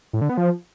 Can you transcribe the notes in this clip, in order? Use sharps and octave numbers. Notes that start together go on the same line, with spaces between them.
A2
D3
B3
F3